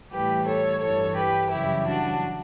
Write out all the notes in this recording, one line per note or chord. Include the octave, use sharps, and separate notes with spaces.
A2 E3 G3 G4 B4
A4 C#5
G2 E3 G3 A4 C#5
G4 B4
F#2 C#3 E3 G3 E4 G4
D4 F#4